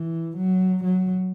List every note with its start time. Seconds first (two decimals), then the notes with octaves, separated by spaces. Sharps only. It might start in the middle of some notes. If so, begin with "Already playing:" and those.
Already playing: E3
0.37 F#3
0.84 F#3